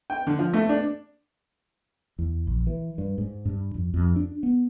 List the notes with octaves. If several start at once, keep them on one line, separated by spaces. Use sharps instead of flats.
G5
D3
F3
A3
D4
E2
A#1
E3
G2
G#2
G2
F2
F2
D4
B3